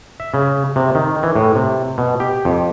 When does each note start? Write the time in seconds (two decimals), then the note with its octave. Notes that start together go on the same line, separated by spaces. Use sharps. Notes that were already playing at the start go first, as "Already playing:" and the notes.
0.20 E5
0.34 C#3
0.76 C3
0.95 D#3
1.23 E3
1.36 A2
1.55 C3
1.98 B2
2.20 G4
2.45 F2